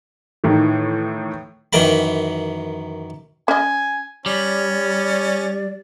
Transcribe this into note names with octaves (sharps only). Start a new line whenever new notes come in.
A2 D#3 E3
F#2 D#3 E3 A#4 G5 B5
C#4 D#5 G#5
G3 C#4 D5